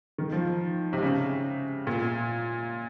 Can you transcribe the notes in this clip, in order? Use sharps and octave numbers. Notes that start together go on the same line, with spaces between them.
D#3
F3
C3
C#3
A#2